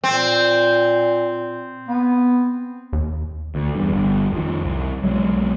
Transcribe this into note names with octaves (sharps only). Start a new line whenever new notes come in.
A#2 C4
B3
D#2
D2
E2 G2
G1
F2 D#3
C2
B1 F#3 G#3